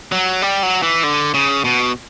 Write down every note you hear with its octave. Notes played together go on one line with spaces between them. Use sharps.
F#3
G3
F#3
E3
D3
C#3
B2